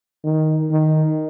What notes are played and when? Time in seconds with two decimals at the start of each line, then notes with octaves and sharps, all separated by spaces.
0.24 D#3
0.71 D#3